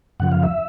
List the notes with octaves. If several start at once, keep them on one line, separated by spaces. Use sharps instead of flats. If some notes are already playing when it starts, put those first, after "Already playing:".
F#2 C#3 F3 F#5
F5
E5